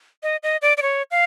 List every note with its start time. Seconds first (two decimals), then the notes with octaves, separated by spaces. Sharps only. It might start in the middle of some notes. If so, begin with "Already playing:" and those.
0.23 D#5
0.43 D#5
0.62 D5
0.77 D5
0.82 C#5
1.11 F5